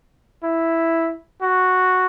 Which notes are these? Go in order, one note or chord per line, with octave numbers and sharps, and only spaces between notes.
E4
F#4